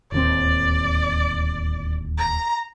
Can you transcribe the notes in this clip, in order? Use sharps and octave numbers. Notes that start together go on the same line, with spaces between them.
D1 D#2 C4 D5
A#5